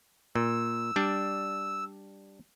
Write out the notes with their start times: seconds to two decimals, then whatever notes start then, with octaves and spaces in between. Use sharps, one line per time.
0.35 A#2 E6
0.96 G3 D4